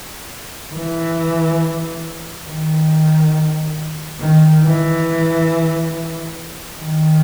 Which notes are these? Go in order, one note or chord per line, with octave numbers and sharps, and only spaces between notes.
E3
D#3
D#3
E3
D#3